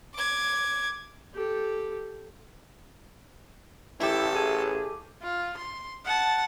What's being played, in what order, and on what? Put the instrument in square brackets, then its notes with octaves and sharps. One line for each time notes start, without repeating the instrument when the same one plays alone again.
[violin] D6 G#6
[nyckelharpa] G4 A4
[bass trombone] A1 [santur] A3 G4 [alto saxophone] E4 [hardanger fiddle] A4
[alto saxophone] G#4
[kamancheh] F4
C6
F#5 A5